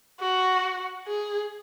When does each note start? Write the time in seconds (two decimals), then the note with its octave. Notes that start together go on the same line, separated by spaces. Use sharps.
0.21 F#4
1.07 G#4